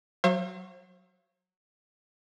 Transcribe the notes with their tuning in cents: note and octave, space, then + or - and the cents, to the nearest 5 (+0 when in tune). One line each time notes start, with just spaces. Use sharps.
F#3 +0 C5 +45 F5 -40